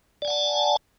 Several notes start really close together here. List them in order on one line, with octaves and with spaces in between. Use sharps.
D5 G#5 F#5 A5